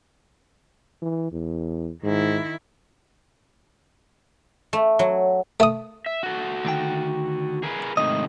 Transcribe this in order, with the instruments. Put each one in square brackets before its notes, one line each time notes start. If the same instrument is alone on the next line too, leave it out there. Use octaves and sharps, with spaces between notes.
[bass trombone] E3
E2
[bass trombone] G#2 [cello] D#3 E4
[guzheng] A3
F#3
[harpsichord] A3 D#6
[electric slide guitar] E5
F#4 A4
[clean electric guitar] D2 D#3 G5
[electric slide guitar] G#4 A#4 B4
[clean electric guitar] G#2 D#5 [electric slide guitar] C3 D#3 A3